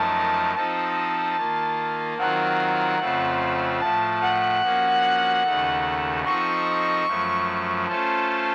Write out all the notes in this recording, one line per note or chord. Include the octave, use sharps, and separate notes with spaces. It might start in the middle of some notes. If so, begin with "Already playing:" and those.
Already playing: F#2 F3 A3 D#4 A#4 A5
F3 C4 D#4 A4 D#5 A5
D#3 A#3 F4
D#3 F#3 C4 F4 A#4 F#5
F2 C#3 A3 C4 F4
A2 F3 A3 A5
F#5
F3 A#3 C#4 F#4
D#2 C#3 A3 D#4 A4
F3 C4 D#4 A4 D#5 C#6
F#2 F3 A3
A3 C#4 F4 A4 C5 A5